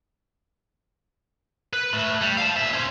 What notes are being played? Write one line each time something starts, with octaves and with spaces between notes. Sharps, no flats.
B4
A3 B5
G3
F5 A5
A#2 E5
C#4 C5